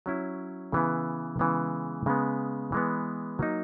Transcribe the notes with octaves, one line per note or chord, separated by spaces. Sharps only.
F#3 C#4 E4
C#3 E3 B3 E4
C#3 E3 G#3 B3
C#3 G#3 B3
E3 G#3 B3
F#3 A#3 D#4